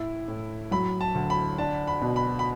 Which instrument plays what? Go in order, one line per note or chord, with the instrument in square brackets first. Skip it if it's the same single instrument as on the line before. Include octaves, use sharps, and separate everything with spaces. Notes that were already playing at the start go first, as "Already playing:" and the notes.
Already playing: [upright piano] A2 E4
A2
[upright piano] F#3 [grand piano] B5
[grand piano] A5
[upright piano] D2
[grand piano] B5
[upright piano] D4 [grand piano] A5
[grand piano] B5
[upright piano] B2
[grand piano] B5
B5